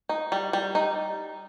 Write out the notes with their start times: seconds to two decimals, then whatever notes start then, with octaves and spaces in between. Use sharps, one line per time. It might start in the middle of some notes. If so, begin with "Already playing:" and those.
0.09 D#4
0.32 G3
0.53 G3
0.75 D#4